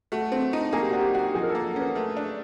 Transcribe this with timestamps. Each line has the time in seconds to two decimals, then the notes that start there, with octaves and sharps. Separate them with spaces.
0.12 A3 F#4
0.32 C4
0.53 D#4
0.73 A#3 G#4
0.81 G4
0.90 D4 F#4
0.99 G4
1.14 F#4
1.35 F3 G#4
1.43 A#4
1.50 A4
1.55 A#3
1.76 C#4 B4
1.95 A3
2.17 D4